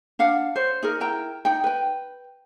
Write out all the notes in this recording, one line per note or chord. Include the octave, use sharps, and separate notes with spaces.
D4 F5 F#5
C5 C#5
D#4 G#4 A#4
E4 A#4 G5 A#5
D#4 G5
B4 G5